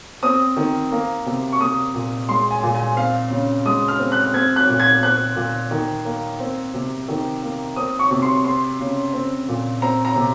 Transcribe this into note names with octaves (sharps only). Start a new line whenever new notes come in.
C4 D#6
D#3
A#3
C3
C#6
A#3 D#6
A#2
G#3 C6
G#5
A#2
G#5
C4 F5
C#3
G#3 D#6
F6
C4
F#6
C4 G#6
F#6
A#2
G#6
C4 F#6
A#2
D#3
A#3
C4
C3
D#3
A#3
C4 D#6
C#6
C3
C6
C4 C6
C#3
C4
A#2
C4 A#5
A#5
C3